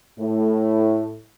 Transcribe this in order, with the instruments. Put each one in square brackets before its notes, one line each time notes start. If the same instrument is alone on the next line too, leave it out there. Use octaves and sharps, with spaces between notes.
[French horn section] A2